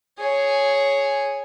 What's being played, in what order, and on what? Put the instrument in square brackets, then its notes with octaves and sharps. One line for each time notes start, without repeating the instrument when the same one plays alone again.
[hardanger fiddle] G#4 C#5